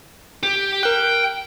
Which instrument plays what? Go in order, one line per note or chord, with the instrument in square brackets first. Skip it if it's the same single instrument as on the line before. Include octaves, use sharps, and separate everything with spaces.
[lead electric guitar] G4
[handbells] A#4 F#6 [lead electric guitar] G5